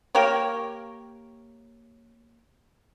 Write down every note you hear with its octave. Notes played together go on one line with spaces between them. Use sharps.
A#3 G4 A#4 C#5